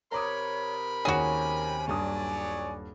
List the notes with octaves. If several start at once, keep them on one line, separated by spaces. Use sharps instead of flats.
C3 A#4 C#5 A#5 B5 D6 D#6
D#2 C#4 F#4 G#4 G#5
D#1 G2 F#3 C#5 D5 D#6